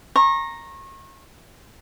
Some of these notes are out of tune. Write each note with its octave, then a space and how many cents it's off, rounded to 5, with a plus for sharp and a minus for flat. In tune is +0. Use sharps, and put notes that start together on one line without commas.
A#5 +0 C#6 -35